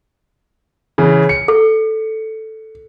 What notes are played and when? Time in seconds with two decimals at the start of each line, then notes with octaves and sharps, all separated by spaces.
0.98 C#3 E3
1.29 C#7
1.48 A4